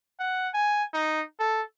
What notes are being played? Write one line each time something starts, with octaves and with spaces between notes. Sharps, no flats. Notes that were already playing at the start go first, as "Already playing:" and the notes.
F#5
G#5
D#4
A4